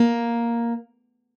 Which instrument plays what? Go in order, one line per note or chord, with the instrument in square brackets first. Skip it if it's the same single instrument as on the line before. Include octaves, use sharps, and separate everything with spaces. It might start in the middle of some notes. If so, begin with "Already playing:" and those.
Already playing: [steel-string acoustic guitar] A#3